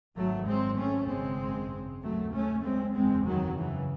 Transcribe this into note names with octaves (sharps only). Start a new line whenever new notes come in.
G#1 G#2 F#3 A3
G#3 C4
A3 C#4
G#1 F#2 C#3 G#3 C4
D#2 C#3 F#3 A3
A3 C#4
G#3 C4
F#1 E2 C#3 G#3 C4
D#3 F#3
C#3 E3